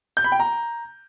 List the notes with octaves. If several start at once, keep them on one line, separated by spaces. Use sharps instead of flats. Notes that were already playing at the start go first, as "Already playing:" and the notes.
G6
B5
G5
A#5